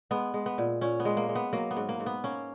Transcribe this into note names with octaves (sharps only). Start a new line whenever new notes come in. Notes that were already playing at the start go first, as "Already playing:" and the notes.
G#3 B3
G#3
B3
A#2
A#2 C#4
B3
G#3
A#3
G#3
B3
F#3 A#3
B3
G#2
A#3
G#2
B3
A#3 C#4